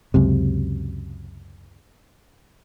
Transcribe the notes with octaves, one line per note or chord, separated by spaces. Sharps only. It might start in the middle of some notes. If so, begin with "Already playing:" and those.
C#2 F#2 C3